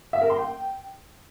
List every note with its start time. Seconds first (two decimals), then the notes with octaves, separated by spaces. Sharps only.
0.13 E5
0.21 A#4
0.30 C6
0.38 G5